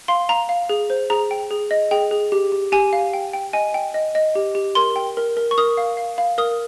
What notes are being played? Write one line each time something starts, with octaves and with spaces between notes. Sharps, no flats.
F5 C6
F5 A#5
F5
G#4
C5
G#4 A#5
G5
G#4
D#5
G#4 G5
G#4
G4
G4
G4 G#5
F5
G5
G5
D#5 G#5
G5
D#5
D#5
G4
G4
A#4 C6
G5
A#4
A#4
C#6
A#4 D#6
F5
F5
F5
A#4 D#6